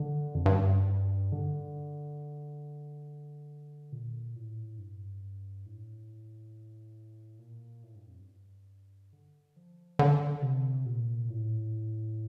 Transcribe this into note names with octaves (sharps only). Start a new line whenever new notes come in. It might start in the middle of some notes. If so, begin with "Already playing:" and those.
Already playing: D3
F2
G2
D3
A#2
A2
G2
A2
A#2
A2
G2
F2
G2
D3
F3
D3
C3
A#2
A2